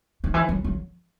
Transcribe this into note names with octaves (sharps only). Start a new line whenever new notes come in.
D#3
E3
F#3
F#3